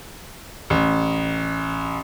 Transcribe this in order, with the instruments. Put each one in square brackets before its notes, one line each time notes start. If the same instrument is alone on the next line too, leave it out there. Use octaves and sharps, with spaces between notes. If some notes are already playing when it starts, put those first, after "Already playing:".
[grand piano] A1